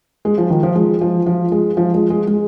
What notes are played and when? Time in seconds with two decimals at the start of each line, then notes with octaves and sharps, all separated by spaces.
0.25 G#3
0.38 F3
0.50 D#3
0.63 F3
0.75 G#3
1.01 F3
1.26 F3
1.52 G#3
1.77 F3
1.94 G#3
2.10 G#3
2.27 G#3